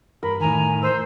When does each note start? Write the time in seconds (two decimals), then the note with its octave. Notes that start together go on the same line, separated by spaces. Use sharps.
0.23 G2 A#4 B5
0.40 A2 D#3 G#5 A#5
0.82 C5 E6